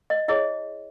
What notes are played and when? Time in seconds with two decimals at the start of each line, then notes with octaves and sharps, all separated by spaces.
0.10 D#5
0.28 E4 G#4 C#5 D#5